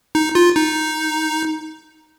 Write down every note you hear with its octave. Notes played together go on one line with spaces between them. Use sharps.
D#4
F4
D#4